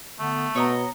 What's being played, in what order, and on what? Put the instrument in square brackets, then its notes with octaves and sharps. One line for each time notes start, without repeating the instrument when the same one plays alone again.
[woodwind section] D3 B3 [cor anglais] A3
[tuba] B2 [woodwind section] B3 [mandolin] C#5 D#5 A#5